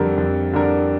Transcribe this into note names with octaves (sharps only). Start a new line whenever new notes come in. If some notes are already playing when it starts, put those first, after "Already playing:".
Already playing: F2 D3 G3 D4 A#4
F2
D3 G3 D4 A#4